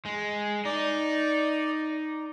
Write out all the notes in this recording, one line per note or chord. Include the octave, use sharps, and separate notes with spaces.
G#3
D#4 D5